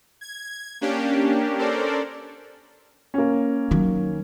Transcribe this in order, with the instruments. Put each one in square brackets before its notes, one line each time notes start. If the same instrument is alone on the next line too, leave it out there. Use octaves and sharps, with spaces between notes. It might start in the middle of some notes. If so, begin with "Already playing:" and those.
[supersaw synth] G#6
A#3 C#4 D4 G4
C#4 D4 A4 A#4 C5 D5
[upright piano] A#3 C#4
[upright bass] D#3 F#3